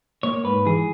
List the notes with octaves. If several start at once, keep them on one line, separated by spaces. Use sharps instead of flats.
A#3 C#5
G#2 B4
E3 G#4